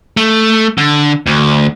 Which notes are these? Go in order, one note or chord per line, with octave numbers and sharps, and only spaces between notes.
A3
D3
D2